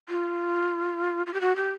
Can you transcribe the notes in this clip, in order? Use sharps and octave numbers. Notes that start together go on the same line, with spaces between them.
F4
F4
G4
F#4
G4